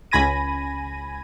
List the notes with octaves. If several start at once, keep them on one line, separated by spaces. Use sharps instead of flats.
C#2 G#5 B5 G#6 A#6 D#7